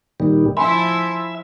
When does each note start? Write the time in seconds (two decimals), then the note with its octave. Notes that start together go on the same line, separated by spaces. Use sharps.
0.20 A#2 D#3 G3
0.57 F3 E4 E5 G#5 B5 C6